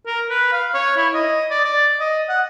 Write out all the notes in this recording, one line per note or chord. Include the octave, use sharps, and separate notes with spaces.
A#4
B4
F5
C#5
E4
D#5
D5
D5
D#5
F#5